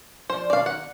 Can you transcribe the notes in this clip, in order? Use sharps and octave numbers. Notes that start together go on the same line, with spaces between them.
F3 C5 D5
B2 D#3 D5 F5
F#5